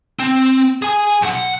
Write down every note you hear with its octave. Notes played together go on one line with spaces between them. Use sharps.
C4
G#4 G#5
B1 F#5